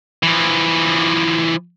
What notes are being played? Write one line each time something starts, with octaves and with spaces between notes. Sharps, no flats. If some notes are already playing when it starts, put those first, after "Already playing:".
E3 F3